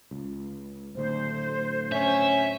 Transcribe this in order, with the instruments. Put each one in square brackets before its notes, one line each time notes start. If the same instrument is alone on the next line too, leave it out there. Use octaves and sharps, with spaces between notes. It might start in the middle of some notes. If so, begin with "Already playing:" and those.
[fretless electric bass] C#2
[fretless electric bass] D1 D2 [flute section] C5
[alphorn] C#4 [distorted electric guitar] E5